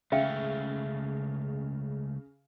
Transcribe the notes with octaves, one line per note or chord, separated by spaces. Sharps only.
C#2 C#3 A3 E5 F5 G5